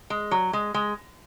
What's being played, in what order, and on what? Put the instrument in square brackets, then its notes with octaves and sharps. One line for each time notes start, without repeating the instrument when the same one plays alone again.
[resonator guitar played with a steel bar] G#3
F#3
G#3
G#3